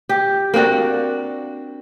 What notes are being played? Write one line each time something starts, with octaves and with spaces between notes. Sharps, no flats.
G4
A#3 C4 D4 F#4